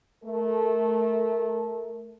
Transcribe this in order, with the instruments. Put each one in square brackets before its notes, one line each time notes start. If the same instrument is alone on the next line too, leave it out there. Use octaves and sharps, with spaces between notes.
[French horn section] A3 A#4